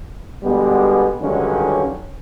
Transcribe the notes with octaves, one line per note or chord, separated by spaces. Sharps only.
B2 D3 G3 G#3 B3
G2 D3 D#3 F#3 G#3 C#4